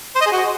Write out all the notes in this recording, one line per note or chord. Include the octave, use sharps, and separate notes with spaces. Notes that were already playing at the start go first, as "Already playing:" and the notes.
C5
D#5
G#4
F#4